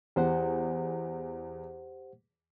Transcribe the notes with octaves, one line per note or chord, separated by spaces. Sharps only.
E2 G4 C5 F#5